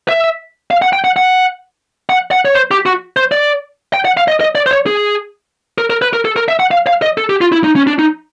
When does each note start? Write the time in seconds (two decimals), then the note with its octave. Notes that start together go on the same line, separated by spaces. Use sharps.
0.09 E5
0.71 F5
0.82 F#5
0.93 G5
1.04 F#5
1.16 F#5
2.09 F#5
2.31 F#5
2.45 C#5
2.55 C5
2.71 G4
2.86 F#4
3.17 C5
3.32 D5
3.94 G5
4.05 F#5
4.17 F5
4.28 D#5
4.41 D#5
4.55 D5
4.66 C5
4.71 C#5
4.86 G#4
5.78 A#4
5.90 A#4
6.02 B4
6.13 A#4
6.25 A4
6.36 A#4
6.48 E5
6.60 F#5
6.71 F5
6.87 F5
7.02 D#5
7.18 A4
7.30 G4
7.41 F4
7.52 E4
7.64 D#4
7.76 C#4
7.87 D4
7.99 D#4